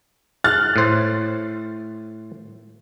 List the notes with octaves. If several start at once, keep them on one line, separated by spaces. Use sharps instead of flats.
F6 F#6 A6
A2 C5